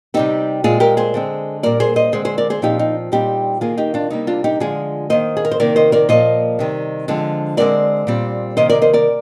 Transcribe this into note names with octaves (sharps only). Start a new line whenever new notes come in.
C3 G3 C4 D#4 G4
A#2 G#3 C4 F4 G#4
G4 A#4
G#4 C5
D3 G#3 C4
A#2 G3 A#3 A#4 D5
G#4 C5
C5 D#5
D3 G#3 C4 G#4 C5
G#4 C5
A#4 D5
G#4 C5
A#2 F3 C4 D#4 G4
D#4
A#2 G3 C4 D#4 G4
D#3 A#3 F4 G#4
D#4 G4
D4 F4
C3 G3 A#3 D#4
D4 F4
D#4 G4
D3 F3 G#3 F4 G#4
D#3 A#3 C5 D#5
G#4
A#4
C5
C3 D#3 A#3 A#4 D5
C5 D#5
A#4 D5
A#2 F3 A#3 C5 D#5
C3 D#3 G3
D3 F3 G#3 C4
D3 G#3 C4 A#4 D5
A#2 G3 C4
C3 D#3 A#3 C5 D#5
A#4 D5
C5 D#5
A#4 D5